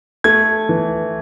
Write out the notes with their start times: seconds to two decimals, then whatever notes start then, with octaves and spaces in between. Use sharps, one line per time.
0.24 A3 G#6
0.69 E3